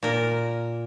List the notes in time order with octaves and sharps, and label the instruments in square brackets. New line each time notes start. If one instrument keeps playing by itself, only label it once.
[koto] A#2 A#4